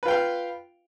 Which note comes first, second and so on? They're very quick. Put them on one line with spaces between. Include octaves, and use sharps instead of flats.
B4 F4 G5 F5